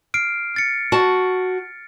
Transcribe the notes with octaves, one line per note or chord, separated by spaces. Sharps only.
F6 C7 D7
F6 A6 C#7
F#4 A5